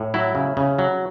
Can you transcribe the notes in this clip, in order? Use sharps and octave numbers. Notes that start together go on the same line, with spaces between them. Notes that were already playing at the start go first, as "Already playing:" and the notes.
Already playing: A2
F#3 E4
C#3
C#3
F#3